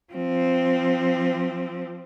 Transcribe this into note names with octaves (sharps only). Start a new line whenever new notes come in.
F3 C4